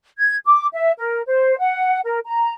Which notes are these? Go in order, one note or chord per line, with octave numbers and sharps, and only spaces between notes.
G#6
D6
E5
A#4
C5
F#5
A#4
A#5